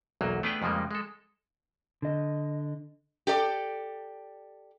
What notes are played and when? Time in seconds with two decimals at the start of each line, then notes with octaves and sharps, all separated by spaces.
0.21 B1 E2 F#3 A#3
0.43 A3 B3 D4 G#4 B4 G5
0.62 F2 C#3 F3 G3 G#3 A#3
0.91 G#3 A4
2.02 D3 D#5
3.27 G4 A4 D5